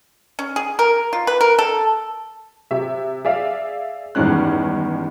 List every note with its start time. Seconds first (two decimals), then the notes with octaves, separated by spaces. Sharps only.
0.39 C#4
0.56 G#4
0.79 A#4
1.13 F4
1.27 B4
1.41 A#4
1.59 A4
2.71 C3 E5
3.25 G#4 D5 E5 F5
4.15 E2 G2 D#3 G#3 C#4 F#6